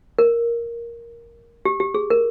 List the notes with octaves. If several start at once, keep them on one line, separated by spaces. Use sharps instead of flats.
A#4
G4
G4
G#4
A#4